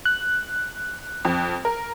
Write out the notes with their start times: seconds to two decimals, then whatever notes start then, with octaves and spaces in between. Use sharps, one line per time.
0.05 F#6
1.25 F2
1.65 A#4